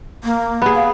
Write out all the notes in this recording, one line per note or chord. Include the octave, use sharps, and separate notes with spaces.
A#3
B3 G#4
F5